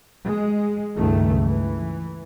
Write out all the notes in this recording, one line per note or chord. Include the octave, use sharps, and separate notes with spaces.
G#3
C#2 G2 D#3 A3
E3